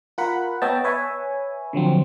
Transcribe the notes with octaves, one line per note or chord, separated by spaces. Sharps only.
F4 A#4 F#5 B5
B3 C#5 D#5 E5 G5 A5
B4 C#5 E5 G#5
D3 F3 F#3 C4